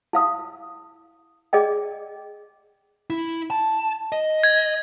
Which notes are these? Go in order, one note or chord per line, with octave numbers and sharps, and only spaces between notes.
E4 F5 D#6
G#4 D5 D#5 G5
E4
A5
D#5
G#6